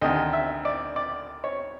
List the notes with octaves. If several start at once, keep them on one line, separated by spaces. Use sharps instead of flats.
D2 C3 D#3 D#5
E5
D5
D5
C#5